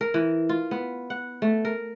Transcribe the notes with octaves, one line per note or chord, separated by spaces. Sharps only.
A#4
E3
F4
B3
F#5
A3
A#4